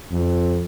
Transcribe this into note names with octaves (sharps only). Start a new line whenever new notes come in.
F2